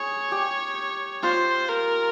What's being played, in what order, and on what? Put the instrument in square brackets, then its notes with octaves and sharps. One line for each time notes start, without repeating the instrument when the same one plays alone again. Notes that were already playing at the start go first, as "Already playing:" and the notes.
Already playing: [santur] G#4 [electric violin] C#5
[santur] G4
[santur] F4 [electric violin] C5
[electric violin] A#4